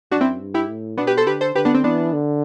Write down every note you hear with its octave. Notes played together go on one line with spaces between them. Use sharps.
F#2 D4 F#4
C4 E4
G2
E4 G4
A2
B2 B3 D4
G4 B4
A4 C5
D3 G4 B4
A4 C5
D3 G4 B4
B3 D4
C4
E3 B3 D4
D3